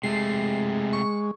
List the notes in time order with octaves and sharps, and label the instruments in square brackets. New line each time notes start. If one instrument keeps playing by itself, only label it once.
[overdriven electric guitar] C3 A3 [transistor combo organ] G#3 [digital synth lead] C7
[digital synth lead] C#6